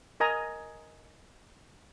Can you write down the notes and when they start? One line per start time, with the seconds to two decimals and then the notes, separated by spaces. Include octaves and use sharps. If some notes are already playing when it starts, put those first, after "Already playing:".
0.20 A#4 D#5 G#5 A#5